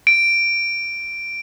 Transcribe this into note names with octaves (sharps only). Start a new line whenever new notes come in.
D7